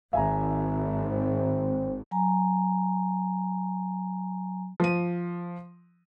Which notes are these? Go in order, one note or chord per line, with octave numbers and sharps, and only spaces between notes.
G#1 E5 G#5 A#5
C4
F#3 G#5 A#5
F3 D#7